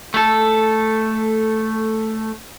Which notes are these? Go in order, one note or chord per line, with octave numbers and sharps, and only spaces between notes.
A3 A4